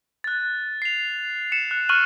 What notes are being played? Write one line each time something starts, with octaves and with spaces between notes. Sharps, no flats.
F#6 A6
C7 F7
C#7 E7
F#6
C#6 F6 F#6 D#7 F#7